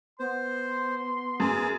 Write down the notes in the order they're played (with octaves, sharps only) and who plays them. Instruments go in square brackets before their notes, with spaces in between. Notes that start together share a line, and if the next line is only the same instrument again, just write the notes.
[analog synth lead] B3 [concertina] C5 [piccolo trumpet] C6
[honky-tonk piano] F#2 [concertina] G#4